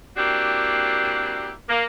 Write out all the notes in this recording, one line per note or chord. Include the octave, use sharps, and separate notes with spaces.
A#3 C4 D4 E4 F#4 G4
A#3